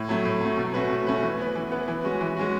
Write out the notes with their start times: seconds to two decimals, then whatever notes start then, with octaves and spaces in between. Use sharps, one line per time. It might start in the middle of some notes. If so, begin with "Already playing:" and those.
Already playing: A2
0.09 F#3 A3
0.25 A2
0.41 F#3 A3
0.58 B2
0.74 A3 C#4 F#4 B4
0.91 B2
1.07 A3 C#4 F#4 B4
1.23 E3
1.39 B3 E4 B4
1.55 E3
1.72 B3 E4 B4
1.88 E3
2.04 G#3 C#4 F#4
2.21 E3
2.36 G#3 C#4 F#4